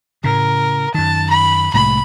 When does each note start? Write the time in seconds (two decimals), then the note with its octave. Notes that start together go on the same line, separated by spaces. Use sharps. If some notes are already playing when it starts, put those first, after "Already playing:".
0.24 A2 C#3 A#4
0.94 F#2 D#3 A5
1.30 B5
1.74 C2 A2 G#3 B5